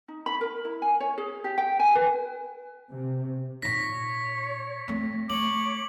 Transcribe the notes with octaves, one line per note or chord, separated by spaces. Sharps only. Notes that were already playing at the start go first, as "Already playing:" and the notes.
D#4
B5
A#4
E4
G#5
C#5
G#4
G4
G5
G#5
B4
C3
A#2 D#4 C#5 A#6 B6
A3 C4
A3 C#5 D6 F#7